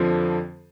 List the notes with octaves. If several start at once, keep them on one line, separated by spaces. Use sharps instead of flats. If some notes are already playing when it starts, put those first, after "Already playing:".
Already playing: F2 D3 F3